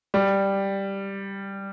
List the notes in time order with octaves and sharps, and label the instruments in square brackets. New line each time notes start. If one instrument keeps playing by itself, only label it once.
[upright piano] G3